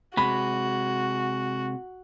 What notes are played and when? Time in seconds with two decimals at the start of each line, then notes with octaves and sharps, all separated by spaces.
0.17 C3 G#3 F#4 B5